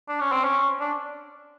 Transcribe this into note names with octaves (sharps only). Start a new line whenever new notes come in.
D4
C#4
C4
C#4
D4